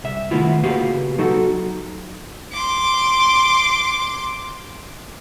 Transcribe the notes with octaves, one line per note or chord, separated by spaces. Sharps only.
C2 E5
D#3 A3 B3 E4 F4
C#3 A#3 F#4 G4 B4 F5
F#3 D#4 F#4 A4
C6 D6